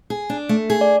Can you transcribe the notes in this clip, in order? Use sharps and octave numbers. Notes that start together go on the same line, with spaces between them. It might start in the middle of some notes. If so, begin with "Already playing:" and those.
G#4
D4
A3
G#4
D5